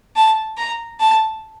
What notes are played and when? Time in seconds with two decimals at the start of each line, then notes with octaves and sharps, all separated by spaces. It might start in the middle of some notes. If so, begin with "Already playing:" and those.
0.16 A5
0.57 A#5
1.00 A5